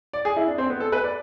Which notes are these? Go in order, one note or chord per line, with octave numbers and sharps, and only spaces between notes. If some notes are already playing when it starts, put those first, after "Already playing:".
D5
G#4
E4
D4
C4
B3
A4
B4
D5